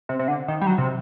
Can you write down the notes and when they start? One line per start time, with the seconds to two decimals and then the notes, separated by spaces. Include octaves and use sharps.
0.09 C3
0.19 C3
0.28 D3
0.48 D#3
0.61 G3
0.67 F#3
0.78 C3